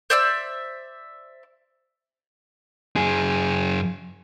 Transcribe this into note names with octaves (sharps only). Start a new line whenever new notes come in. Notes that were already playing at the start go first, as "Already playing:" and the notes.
C5 D5 E5 E6
F#2 G#4